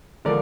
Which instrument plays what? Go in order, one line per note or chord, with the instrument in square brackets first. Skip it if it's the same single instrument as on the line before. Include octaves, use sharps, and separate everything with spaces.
[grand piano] D3 F3 G#3 A#4 D5